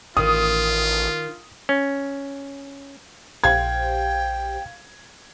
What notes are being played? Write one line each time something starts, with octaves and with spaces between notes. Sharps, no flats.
A1 D#3 F4 D#6
C#4
A#1 G4 C5 F5 G5 G#6